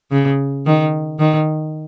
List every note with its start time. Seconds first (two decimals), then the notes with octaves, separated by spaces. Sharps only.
0.12 C#3
0.66 D#3
1.19 D#3